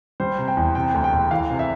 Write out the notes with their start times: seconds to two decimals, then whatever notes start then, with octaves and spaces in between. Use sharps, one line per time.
0.20 G3 C5
0.38 C3
0.48 G5
0.57 E2
0.75 C3 G5
0.94 D2
1.04 G5
1.13 E1
1.31 E3 F5
1.50 C3
1.59 E5